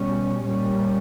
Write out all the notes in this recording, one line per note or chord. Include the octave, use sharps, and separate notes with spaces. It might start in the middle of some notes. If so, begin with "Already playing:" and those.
Already playing: B2 G3 C#4
A#2 G3 A#3 C#4